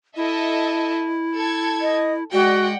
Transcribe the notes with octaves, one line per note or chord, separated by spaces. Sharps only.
E4 A4 D#5 E5
A4 G#6
D#5
G#3 F#4 D5 F#5 G5